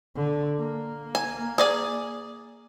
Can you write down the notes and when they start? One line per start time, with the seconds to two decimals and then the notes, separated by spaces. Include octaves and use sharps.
0.15 D3
0.59 A#3
1.15 G#5
1.58 G#4 D5 G#5